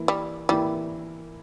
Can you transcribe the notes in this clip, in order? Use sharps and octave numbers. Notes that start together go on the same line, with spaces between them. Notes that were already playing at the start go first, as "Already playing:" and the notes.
Already playing: E3 A#3 E4
G3
E3 G3 A#3 E4